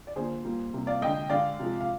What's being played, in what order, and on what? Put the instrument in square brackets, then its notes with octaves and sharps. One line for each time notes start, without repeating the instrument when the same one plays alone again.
[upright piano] D5
D3 F3 A#3 G#4 C5
A#2 G3 A#3
C3 G3 A#3
D5 F5
D3 G#3 D#5 G5
D3 G#3 D5 F5
C3 F3 G#3
F5